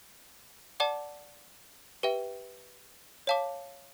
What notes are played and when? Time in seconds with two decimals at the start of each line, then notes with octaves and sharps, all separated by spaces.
0.80 D5 F#5 A5 D6
2.03 G4 B4 E5 G5
3.27 C#5 F5 A5 D6